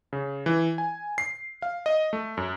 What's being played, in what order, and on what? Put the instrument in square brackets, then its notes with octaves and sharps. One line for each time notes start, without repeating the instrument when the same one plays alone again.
[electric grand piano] C#3
E3
G#5
C7
F5
D#5
A3
F#2